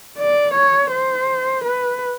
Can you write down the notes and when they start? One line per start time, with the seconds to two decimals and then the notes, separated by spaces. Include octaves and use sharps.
0.18 D5
0.55 C#5
0.92 C5
1.65 B4